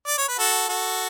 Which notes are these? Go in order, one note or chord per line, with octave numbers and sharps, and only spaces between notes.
D5
C#5
B4
F#4 A4
F#4 A4